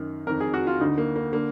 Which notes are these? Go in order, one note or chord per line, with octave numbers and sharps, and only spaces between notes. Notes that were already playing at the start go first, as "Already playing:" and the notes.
Already playing: F#2 D#3
F2 D#3 A#4
G#4
F#4
F4
D2 D3 D#4
A#3
A#3
D3 A#3